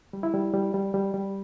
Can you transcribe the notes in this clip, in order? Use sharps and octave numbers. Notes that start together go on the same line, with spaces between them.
G3
E4
G3
G3
G3
G3
G3